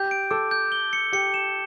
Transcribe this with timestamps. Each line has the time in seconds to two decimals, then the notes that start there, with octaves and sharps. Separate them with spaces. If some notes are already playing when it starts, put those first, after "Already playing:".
Already playing: G4 G6
0.11 D7
0.31 A4 D6
0.51 G6
0.72 G7
0.93 C#7
1.13 G4 C#7
1.34 E7